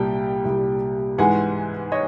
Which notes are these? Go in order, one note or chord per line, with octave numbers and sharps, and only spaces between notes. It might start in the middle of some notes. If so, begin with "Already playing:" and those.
Already playing: C2 A#2 G3 G5 A5
C2 A#2 G3
G#2 E3 G#3 F#5 G#5
C#5 D#5